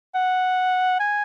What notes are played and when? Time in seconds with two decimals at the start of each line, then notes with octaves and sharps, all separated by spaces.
0.15 F#5
1.00 G#5